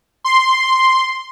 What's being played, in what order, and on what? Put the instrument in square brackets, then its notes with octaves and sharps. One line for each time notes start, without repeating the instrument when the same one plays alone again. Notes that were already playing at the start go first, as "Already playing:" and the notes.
[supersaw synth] C6